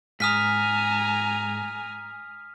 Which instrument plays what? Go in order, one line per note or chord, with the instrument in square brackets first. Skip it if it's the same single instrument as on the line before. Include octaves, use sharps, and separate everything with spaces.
[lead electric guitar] G#2 [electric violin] G#5 A#5 [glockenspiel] D#6 F6 B6